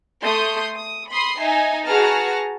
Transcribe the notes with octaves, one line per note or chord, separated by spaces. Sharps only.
A3 C6 D#6 G6
D#6
B5 C6 D#6 C7
D#4 E5 G#5
F#4 G#4 B4 A5 A#5 F6